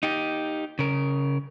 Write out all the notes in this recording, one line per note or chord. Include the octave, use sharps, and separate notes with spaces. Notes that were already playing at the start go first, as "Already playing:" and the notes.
D#4 G4
C#3 A#4